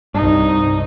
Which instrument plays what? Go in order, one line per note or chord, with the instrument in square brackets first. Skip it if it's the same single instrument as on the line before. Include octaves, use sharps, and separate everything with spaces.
[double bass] C2 D#4 [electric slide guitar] G2